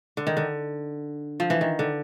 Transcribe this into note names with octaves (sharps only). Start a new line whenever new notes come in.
D3
D#3
D3
F3
E3
D#3
D3